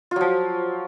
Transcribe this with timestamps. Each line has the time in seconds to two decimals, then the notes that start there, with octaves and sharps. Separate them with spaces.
0.11 F4
0.16 F#3
0.21 F3